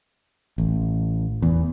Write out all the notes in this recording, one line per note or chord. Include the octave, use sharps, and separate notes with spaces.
A1
E2